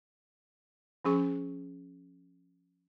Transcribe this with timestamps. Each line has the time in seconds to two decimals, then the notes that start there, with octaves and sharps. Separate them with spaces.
1.05 F3 C#4 G#4 C#6